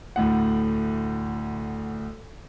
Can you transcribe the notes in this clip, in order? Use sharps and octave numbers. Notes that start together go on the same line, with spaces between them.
D2 A2 F#5